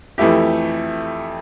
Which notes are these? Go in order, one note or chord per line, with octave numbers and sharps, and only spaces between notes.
F2 E3 A3 E4 G4